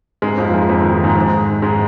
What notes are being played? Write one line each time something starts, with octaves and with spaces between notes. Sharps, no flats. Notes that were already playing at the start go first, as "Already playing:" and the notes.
G#2 G#3
F2 F3
F3
G#2 G#3
F2 F3
D#3
F2 F3
G#2 G#3
G#2 G#3
G#2 G#3